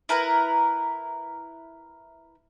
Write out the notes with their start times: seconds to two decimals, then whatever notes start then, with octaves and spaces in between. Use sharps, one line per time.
0.09 E4 A#4 B4 A#5